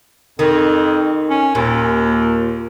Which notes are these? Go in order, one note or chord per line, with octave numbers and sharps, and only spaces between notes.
F2 D#3
C#4
D#2 A#2